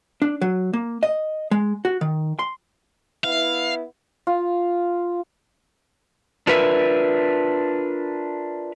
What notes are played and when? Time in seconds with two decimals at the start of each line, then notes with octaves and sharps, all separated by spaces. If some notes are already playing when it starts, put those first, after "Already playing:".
0.22 D4
0.41 F#3
0.73 A#3
1.03 D#5
1.51 G#3
1.85 F#4
2.01 D#3
2.39 C6
3.24 B3 E4 F5
4.27 F4
6.47 D4 F4 A#4 B4 D5 E5